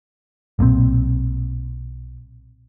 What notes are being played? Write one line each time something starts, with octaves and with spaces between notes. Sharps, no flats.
B1 A#2 C#3 C4